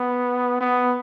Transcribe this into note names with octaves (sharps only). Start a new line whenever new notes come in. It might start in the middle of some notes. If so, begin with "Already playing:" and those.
Already playing: B3
B3